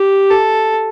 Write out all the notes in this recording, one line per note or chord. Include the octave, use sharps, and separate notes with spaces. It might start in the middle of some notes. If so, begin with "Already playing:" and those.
Already playing: G4
A4